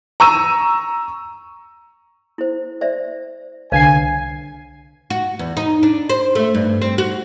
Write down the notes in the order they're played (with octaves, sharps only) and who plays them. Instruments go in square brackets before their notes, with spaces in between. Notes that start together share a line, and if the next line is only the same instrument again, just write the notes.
[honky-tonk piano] A#5 C#6 E6 D#7
[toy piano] E4 C5
C5 D5 E5
[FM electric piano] C2 D3 C7 [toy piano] B4 C#5 F5 [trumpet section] G#5
[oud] F#4
E2
D#4
D4
C5
A3
G2
C4
F#4